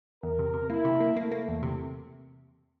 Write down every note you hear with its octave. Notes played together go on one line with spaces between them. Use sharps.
E2 A#4
C3
C3
A#3 E4
C3
A#3
A3 A#3
A#3
E2
C3